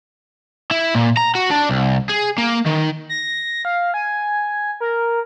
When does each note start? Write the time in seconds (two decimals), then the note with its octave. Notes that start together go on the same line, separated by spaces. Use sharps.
0.71 E4
0.95 A#2
1.17 A#5
1.35 F#4
1.51 D4
1.69 C2
2.09 G#4
2.38 A#3
2.66 D#3
3.09 A#6
3.65 F5
3.94 G#5
4.81 A#4